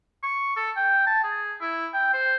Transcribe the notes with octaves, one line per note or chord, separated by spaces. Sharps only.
C#6
A4
G5
A5
G#4
E4
G5
C5